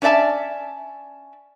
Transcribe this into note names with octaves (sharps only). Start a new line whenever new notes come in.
C#4 D4 D5 E5 A5